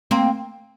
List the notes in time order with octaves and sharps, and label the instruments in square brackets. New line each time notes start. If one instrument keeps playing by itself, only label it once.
[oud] A#3 C4